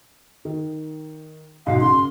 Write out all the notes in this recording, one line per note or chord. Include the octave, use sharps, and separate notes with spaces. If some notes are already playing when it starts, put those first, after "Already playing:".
D#3
B1 G#2 F5
F#2 C#3 C6